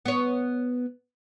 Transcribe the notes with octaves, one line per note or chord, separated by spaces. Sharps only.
B3 C#5